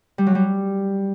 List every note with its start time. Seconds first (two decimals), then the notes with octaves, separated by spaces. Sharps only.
0.18 G3
0.27 F#3
0.35 G3